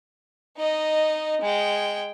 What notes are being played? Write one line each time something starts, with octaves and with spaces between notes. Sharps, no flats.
D#4 D#5
G#3 G5